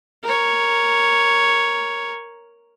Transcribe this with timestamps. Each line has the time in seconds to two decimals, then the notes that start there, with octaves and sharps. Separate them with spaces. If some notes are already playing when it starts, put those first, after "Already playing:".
0.24 A#4 C#5